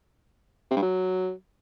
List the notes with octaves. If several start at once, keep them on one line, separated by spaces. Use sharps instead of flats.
C3
G2
F#3